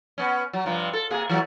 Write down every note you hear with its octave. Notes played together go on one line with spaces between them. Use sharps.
B3 C#4
F#3
G2 C3 F3
A4
C3 A#3 G#4
E3 F#3 A3